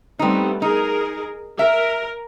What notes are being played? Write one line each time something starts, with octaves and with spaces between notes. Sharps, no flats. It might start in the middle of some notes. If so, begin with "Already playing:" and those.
G3 A3 B3 C4 D#4
D#4 G#4 A#4
A#4 E5